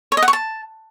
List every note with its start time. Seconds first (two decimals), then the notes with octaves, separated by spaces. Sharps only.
0.12 C#5
0.17 D#5
0.22 F#5
0.28 C#6
0.33 A5